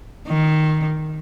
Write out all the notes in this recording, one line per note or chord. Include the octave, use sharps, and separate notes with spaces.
D#3